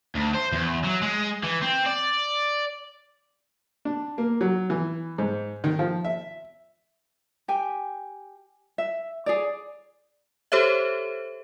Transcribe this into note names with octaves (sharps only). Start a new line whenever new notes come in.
D2
C5
E2
F#3
G#3
E3
C4
D5
D4
A#3
F#3
E3
G#2
D#3
F3
E5
G4 G5 G#5
E5
G#4 C#5 D5
G4 A4 C5 C#5 E5